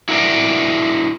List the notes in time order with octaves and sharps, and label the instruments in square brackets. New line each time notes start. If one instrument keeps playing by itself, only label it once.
[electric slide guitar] E4 F#4 A#4 D5